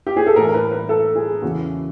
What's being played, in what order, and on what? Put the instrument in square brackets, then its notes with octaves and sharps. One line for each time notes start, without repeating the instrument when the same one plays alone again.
[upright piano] G4
G#4
A4
A2 E3 A#4
A#4
B4
B4
A4
G#4
E2 C#3 E3 F#4